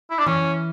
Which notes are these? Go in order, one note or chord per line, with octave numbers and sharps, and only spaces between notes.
E4
D4
E3 C#4